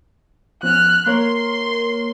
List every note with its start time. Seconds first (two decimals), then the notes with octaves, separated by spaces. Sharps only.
0.63 F3 B3 C#4 F6 F#6
1.06 A#3 A#4 C#5 C6